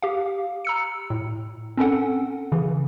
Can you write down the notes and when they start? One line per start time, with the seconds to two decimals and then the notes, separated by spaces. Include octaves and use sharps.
0.02 G4 F5
0.65 A#5 E6 C#7
1.10 A2
1.77 C4 C#4 A4 F#5
2.52 C#3 E3